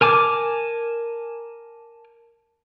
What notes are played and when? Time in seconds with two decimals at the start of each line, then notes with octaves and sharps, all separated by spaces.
0.01 A#4 G#5 A5 D6